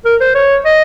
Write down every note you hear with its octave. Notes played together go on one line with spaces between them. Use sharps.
A#4
C5
C#5
D#5